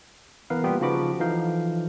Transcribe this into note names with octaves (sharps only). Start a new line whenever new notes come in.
E3 B3 A#4 B4 F5
G3 A#3 B3 F4 G4 G5
C#3 F3 D#4 F#4 B5 D6
E3 F3 D#4 A4 F5 G6